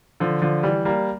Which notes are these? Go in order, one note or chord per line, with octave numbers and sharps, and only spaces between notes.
D3 F3
D3 F3
E3 G3
G3 A#3